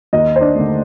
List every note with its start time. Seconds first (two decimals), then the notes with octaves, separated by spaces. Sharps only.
0.13 D#2 D#4 D#5
0.36 C5
0.41 D4 D5
0.55 D3 A3